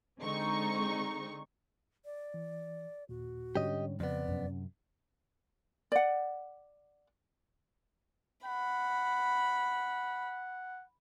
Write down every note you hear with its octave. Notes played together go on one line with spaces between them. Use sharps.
D3 G#3 C4 D#4 C#6
D5
E3
D#2 A#2 F#4
G#2 D3 G3 C#4 D4 G4 C#5 D#5
F2 C#3 F3 B3 D5
F#2 C3 F#3 C#4
D5 F#5
F#5 B5